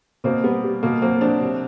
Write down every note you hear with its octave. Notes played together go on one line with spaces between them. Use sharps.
B2 A#3 C4
G3 B3
G3
B2 A#3
F#3 A#3 C4
F#3 C4 D4
C3